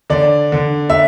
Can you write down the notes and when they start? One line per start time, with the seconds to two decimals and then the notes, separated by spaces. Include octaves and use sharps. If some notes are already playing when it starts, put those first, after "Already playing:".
0.10 D3 D5
0.52 D3
0.90 E5